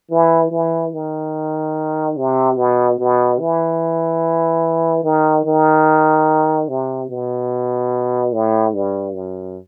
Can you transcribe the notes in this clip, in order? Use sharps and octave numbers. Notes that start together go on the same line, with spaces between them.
E3
E3
D#3
C3
B2
B2
E3
D#3
D#3
C3
B2
A2
G2
F#2